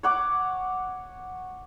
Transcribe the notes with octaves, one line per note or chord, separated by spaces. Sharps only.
C#5 F#5 D6